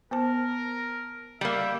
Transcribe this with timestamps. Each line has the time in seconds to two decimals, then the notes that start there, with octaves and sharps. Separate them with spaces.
0.11 B3 A#4 C5 A5
1.41 G3 A#3 E5